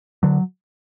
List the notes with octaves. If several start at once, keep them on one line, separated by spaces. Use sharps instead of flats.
D3 F#3